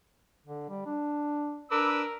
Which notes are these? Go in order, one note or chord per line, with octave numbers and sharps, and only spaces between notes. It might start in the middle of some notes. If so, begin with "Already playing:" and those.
D3
G3
D4
D4 A#4 B4 D6 E6